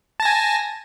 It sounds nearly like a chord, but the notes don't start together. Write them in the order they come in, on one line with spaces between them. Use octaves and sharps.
A5 A#6 G#5